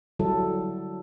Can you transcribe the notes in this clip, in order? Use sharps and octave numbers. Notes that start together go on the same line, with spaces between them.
D3 F#3 G3 E4 A4